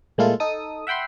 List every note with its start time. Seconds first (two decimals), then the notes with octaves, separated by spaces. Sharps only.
0.18 A#2 G#3 A3 E4 F4 A4
0.40 D#4 A4 D#6
0.87 E5 F#5 G5 B5 C6